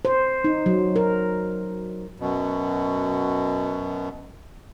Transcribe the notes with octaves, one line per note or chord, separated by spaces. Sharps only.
C5
D#4
F#3
A#4
F#2 B2